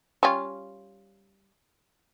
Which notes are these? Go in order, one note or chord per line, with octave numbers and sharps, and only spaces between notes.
G3 C#4 F4